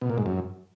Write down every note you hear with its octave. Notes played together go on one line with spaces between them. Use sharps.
B2
A#2
G#2
F#2